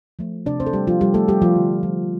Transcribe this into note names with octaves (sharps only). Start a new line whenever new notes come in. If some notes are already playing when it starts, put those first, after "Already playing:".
F3 A3
C3 D4 D5
C4 C5
A4
G3 A3 G4
F3 F4
C3 G3 G4
A3 A4
G3 G4
F3 F4
D3
G3